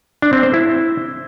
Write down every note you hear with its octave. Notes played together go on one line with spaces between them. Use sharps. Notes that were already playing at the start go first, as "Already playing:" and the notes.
D4
C4
C5
E4